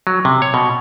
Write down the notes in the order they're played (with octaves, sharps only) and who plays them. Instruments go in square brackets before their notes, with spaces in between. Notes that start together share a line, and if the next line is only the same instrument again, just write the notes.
[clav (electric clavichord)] F#3
C3
C#5
B2